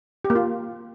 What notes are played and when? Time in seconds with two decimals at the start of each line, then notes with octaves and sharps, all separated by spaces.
0.25 G4
0.30 A#3
0.35 F4